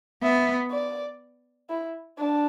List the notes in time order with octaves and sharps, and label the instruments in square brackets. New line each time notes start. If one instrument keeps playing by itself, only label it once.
[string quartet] B3 [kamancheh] E5
[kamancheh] D5
E4
D4